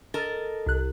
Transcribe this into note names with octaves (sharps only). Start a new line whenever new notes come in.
A4 A#4 D#5 A6
C2 F#6